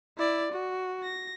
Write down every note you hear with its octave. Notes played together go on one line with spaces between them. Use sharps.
E4 D5
F#4
A#6